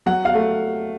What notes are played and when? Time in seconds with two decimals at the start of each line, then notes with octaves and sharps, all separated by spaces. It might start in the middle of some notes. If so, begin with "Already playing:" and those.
0.06 F#3 F#5
0.25 F5
0.35 A3